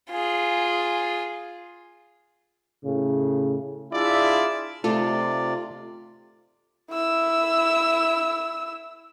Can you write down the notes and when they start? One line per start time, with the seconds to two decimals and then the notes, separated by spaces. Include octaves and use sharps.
0.11 F4 G#4
2.84 A2 C#3
3.93 D4 E4 F4 G#4 D5 E5
4.84 C3 A3 D#4 F4 A4 D5
6.91 E4 E6